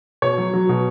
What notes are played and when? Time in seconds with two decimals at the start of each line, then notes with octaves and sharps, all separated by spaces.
0.22 B2 C#5
0.38 F#3
0.53 F#3
0.69 B2